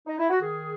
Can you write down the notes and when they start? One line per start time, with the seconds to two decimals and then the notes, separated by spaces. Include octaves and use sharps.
0.07 D#4
0.19 E4
0.29 F#4
0.40 D#3 G#4